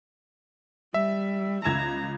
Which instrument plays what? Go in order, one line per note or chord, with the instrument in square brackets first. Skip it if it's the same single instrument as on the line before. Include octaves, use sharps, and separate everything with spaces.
[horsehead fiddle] G3 [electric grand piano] E5
[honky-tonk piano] C#2 G#6 E7 [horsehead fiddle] A#5